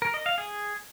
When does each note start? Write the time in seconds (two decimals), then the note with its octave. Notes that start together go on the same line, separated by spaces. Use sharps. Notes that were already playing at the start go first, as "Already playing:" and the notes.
0.02 A#4
0.14 D#5
0.26 F5
0.38 G#4